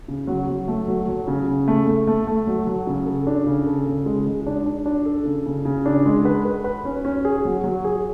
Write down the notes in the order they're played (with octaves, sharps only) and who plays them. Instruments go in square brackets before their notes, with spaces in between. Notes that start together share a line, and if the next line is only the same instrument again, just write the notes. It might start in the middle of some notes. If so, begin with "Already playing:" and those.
[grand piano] C#3
F#3
F#3
A3
F#3
F#3
C#3
C#3
A3
A3
A3
A3
F#3
F#3
C#3
A4
D4
C#3
A4
C#3
G#3
G#3
D4
D4
D4
A4
C#3
C#3
C#3
D4
G#3
B4
B4
B4
C#4
C#4
G#4
F#3
F#3
G#4